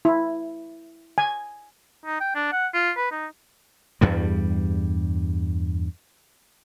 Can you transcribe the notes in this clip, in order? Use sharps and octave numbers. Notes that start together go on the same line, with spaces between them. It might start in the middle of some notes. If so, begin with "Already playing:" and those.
E4
G#5
D#4
G5
D4
F#5
F4
B4
D#4
E2 G2 G3